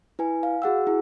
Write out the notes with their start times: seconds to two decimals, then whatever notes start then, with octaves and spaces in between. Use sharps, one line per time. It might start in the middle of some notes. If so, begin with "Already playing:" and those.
0.19 E4 B4 G#5
0.43 F5
0.62 F#4 G#4 F#5 E6
0.87 E4 G#4